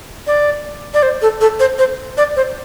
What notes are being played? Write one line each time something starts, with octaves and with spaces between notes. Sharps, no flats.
D5
D5
C5
A4
A4
C5
C5
D5
C5